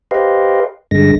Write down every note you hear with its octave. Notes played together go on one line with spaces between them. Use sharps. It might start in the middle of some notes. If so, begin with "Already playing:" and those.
G4 B4 C5 D#5 F5
G2 D3 G#3 A#6